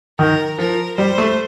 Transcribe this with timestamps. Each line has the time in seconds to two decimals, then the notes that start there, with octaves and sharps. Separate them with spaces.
0.19 D#3 A#4
0.58 F3 A#4
0.98 G3 C5
1.18 A3